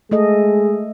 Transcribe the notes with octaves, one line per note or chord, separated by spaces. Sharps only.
G#3 A3 A4 D#5